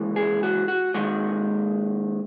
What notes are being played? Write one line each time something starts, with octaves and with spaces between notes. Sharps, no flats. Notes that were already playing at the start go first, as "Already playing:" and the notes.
Already playing: D#2 C#3 E3 G#3
G#4
F#4
F#4
D#2 D#3 G#3 F#4